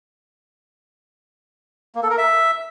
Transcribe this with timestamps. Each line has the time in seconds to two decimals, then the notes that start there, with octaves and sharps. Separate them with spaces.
1.95 A#3
2.03 A4
2.10 A#4
2.18 E5